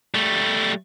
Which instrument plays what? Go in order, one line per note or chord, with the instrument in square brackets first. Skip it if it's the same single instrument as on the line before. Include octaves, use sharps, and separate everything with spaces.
[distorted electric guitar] G3 A3